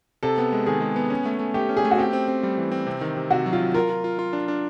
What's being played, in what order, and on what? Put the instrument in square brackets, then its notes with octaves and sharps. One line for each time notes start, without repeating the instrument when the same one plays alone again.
[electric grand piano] C3 [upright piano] A4
[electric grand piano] B3
G#3
[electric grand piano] D#3 [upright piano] G#4
[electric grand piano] G#3
B3
C#4
A3
A3
[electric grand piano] A3 [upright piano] G4
[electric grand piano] C#4
[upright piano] G#4
[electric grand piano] A3
[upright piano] F#4
[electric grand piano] C4 [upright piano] G4
[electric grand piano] C4
C4
G3
E3
C4
C3
D#3
C3
[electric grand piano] C3 [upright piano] F#4
[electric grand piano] F#3
[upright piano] F4
[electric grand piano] F#3
[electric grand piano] F4 [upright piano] A#4
[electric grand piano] F4
F4
F4
D4
D4